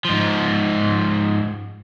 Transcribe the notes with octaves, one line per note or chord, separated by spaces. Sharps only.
G#2 F3